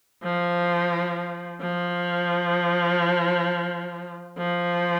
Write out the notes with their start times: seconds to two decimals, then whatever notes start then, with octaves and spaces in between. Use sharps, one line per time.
0.23 F3
1.61 F3
4.38 F3